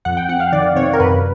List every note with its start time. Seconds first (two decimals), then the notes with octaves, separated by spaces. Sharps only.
0.05 F2 F#5
0.17 G5
0.29 F2 F#5
0.40 F5
0.52 D#3 D5
0.76 C3 C#5
0.93 A#4
1.00 F#2 B4